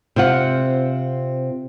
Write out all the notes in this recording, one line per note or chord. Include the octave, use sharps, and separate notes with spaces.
C3 C4 F4 F#5